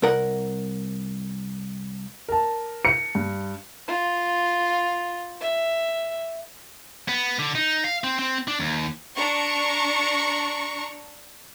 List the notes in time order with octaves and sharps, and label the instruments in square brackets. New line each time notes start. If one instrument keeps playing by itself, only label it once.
[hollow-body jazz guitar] C2 A#4 F#5
[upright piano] A#4 A5
[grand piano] C#7
[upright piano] G2
[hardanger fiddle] F4
E5
[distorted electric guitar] B3
D3
D#4
F5
C4
C4
D4
D#2
[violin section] D4 A#5 C#6